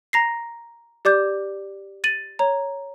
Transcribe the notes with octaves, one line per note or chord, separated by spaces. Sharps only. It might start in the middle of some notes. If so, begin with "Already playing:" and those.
A#5 A#6 C7
G4 D5 D6 G6
A6 D#7 F#7
C#5 A#5